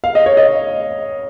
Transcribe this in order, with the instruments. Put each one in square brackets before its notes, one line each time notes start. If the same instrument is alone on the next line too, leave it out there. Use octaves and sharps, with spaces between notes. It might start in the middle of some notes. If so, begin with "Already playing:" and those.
[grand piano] F5
D#5
C#5
D#5